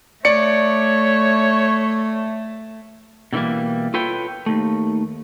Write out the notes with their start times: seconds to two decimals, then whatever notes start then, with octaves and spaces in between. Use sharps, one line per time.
0.25 A3 C#5 D5 C#7
3.33 B2 D3 E3 G3 A#3
3.94 F4 A4 B4 C#5 G5
4.46 D#2 A3